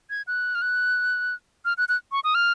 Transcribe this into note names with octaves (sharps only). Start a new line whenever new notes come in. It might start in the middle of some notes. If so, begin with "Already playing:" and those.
G#6
F#6
F6
F#6
F6
F#6
F#6
C#6
D#6
F6